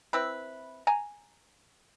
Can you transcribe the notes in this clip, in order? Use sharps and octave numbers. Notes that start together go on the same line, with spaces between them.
C4 E4 B4
G#5 A#5